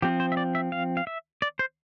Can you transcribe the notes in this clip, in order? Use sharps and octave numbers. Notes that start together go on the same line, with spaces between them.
F3 C4 G4
C5
E5
D5
E5
F5
F5
E5
D5
C5